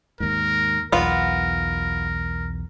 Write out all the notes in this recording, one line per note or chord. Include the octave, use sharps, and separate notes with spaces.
D#2 G#2 A#4
B1 E2 B3 F4 A#4